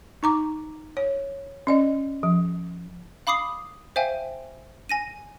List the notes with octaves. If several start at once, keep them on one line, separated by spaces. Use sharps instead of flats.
D#4 A#5 D6
C#5
C#4 D5 D#5
F3
F5 B5 D6 D#6 C7
C5 E5 F5 G5 G#5
G#5 A#6 D#7